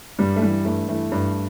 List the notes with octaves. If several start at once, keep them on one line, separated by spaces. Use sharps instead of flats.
G2 G3
A3
E3 G3
G2 A3
E3 A3
G2